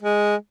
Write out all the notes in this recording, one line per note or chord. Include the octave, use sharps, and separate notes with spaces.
G#3